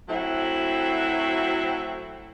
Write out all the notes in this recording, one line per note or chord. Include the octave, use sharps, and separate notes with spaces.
F#3 A3 C4 E4 F#4